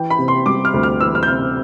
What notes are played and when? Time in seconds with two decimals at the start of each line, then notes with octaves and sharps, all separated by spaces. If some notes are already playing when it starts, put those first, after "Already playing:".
Already playing: E3 G5
0.10 B5
0.19 C3
0.28 C6
0.46 G3 D6
0.65 F6
0.74 D2
0.83 F6
1.00 E3 E6
1.15 F6
1.23 G6
1.28 C3 F6